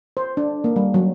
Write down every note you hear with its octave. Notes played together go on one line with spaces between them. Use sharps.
C5
D4
A#3
G3
F#3